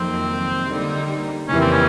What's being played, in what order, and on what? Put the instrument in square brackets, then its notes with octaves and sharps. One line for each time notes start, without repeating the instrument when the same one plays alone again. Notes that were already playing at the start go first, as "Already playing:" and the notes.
Already playing: [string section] F2 C3 D#3 F#3 A#3 [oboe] C4
[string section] D3 G3 A#3 D#4
[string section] F2 C#3 E3 G3 A#3 [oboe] C#4
[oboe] C4
C#4